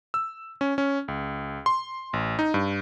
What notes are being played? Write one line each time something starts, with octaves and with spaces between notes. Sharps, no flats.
E6
C#4
C#4
C#2
C6
A1
D#4
G2